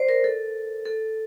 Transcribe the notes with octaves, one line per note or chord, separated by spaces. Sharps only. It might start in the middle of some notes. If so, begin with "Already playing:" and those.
Already playing: C5 D5
A#4
A4
A4